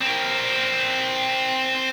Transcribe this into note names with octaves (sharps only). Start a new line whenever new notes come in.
C4 A#4